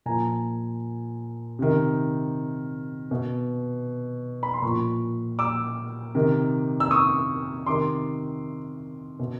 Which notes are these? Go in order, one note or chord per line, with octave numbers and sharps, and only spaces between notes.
A#2 F3 G#5 A#5
C3 D#3
B2
B5
C6
A#2 F3 B5 C#6
D6 E6
C3 D#3
E6
C#6 D#6
C3 D#3 C6 D6
B2